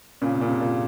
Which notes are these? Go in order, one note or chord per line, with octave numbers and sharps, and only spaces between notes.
A#2 C#3
C3
A#2 C#3
C3
A#2